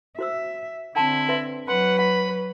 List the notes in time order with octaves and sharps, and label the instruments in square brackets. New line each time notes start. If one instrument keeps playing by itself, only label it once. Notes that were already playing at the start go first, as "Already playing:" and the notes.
[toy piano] F#4 C5 E6 [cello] E5
[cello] D3 C4 [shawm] E4 [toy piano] F#5 A5 C6
[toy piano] B4 E5 C6
[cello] F#3 B4 [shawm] F#5 [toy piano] C6
[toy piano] F#5 [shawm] B5